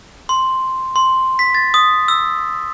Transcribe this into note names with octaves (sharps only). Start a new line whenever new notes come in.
C6
C6
B6
A6
D#6
E6